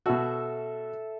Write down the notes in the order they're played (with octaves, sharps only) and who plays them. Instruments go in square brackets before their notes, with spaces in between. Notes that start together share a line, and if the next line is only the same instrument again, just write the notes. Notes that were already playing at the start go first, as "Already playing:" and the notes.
[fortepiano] B2 F#4 [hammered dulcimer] A4 E5